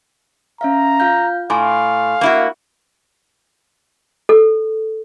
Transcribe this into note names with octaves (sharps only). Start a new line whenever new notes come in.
C#4 E5 F5 A#5
F4 F5 G6
A2 F5 G#5 C6 D6
A#3 E4 F#4
A4